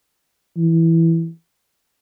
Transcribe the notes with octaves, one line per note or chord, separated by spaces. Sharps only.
E3